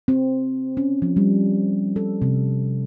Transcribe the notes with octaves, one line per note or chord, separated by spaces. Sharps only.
C4
C#4
F3
G3
A4
C3